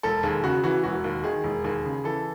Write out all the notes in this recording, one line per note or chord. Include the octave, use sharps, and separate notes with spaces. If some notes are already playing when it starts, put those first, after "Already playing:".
E1 A4
D#2 G#4
C#3 F#4
E3 F#4
E1 F#4
D#2
D#3 G#4
E1
D#2 G#4
C#3
E3 A4